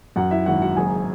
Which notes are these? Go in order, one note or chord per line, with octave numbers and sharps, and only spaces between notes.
F#2 F#4 F#5
E4 E5
G#1 F#4 F#5
F#4 F#5
F#1 G#4 G#5